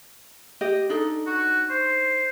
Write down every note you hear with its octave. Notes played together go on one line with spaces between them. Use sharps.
G4 D#5
D4 D#4 A4
F#4
C5